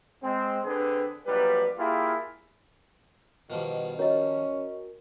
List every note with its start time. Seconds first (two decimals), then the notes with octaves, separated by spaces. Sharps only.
0.22 G#3 C4
0.64 D3 C4 G#4 B4
1.25 A#1 F#3 G3 B4
1.78 A#3 E4 F4 G4 G#4
3.50 B2 D#3 F3 G3
3.99 C#4 F#4 A#4 C#5 D#5